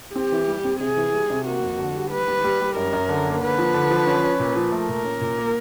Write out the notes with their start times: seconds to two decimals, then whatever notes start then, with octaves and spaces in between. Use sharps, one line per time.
0.15 C4 G4
0.32 E3
0.48 G3
0.65 C4
0.80 C3 G#4
0.97 E3
1.13 G3
1.30 C3
1.46 A#3 F#4
1.62 F2
1.79 D3
1.95 G3
2.11 G3 B4
2.27 G3
2.44 G3
2.61 G3
2.76 F#2 A#4
2.93 F#2
3.09 D3
3.26 A#3
3.41 D3 B4
3.58 F3
3.74 D3
3.91 F3
4.07 C#4
4.24 C#4
4.40 A#2
4.56 F3
4.72 A3 A#4
4.89 A#2
5.04 C#4
5.21 A#2
5.38 A#3